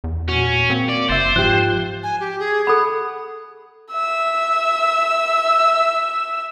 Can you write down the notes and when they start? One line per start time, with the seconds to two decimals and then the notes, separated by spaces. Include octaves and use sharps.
0.04 E2
0.28 A#2 C#4 F#4
0.70 A#3 C4
0.89 D5
1.09 F#1 C5 E5 A6
1.36 G#2 F3 G4 F#6
2.03 G#5
2.20 G4
2.39 G#4
2.67 A4 F#5 B5
3.92 E5 E6